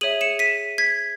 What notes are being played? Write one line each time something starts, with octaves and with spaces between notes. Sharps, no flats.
G#4 C#5 E5 D#7 F#7
C#7 E7
B6 D#7
G#6 B6